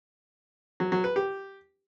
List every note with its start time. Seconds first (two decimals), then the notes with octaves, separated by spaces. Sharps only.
0.80 F#3
0.92 F#3
1.04 B4
1.16 G4